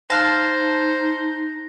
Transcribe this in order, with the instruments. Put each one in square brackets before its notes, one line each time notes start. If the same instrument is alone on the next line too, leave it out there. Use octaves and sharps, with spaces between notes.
[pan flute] D#4 [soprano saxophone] C5 [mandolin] F5 A5 [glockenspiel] F#6 A#6